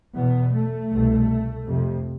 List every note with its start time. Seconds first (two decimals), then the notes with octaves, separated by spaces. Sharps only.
0.15 E2 B2 B3
0.53 A3
0.91 C2 B2
1.66 F2 C3